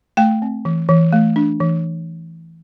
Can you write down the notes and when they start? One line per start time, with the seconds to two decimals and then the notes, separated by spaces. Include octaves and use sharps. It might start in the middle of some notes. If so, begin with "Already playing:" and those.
0.17 A3 G5
0.42 C4
0.65 E3
0.89 E3
1.13 A3
1.36 D4
1.60 E3